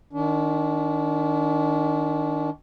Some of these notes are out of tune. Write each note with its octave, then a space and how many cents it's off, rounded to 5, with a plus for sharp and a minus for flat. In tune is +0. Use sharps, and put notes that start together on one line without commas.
D#3 +0 D4 -35